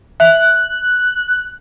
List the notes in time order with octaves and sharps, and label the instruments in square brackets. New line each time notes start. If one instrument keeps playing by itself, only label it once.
[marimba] E5 [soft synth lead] F#6